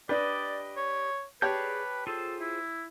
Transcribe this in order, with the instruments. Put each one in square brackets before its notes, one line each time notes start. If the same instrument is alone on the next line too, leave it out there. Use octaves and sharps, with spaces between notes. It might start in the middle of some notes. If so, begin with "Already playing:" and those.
[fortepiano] D4 B4 [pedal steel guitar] G4 D#5 [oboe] D5
[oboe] C#5
[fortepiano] G4 C#5 A5 [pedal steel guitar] G#4 D5 G6 [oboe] B4
[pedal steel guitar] F4 G#4 C5 [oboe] A4
[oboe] E4